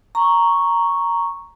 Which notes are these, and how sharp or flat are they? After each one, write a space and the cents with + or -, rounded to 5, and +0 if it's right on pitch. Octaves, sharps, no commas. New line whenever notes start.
A#5 +0 C#6 +0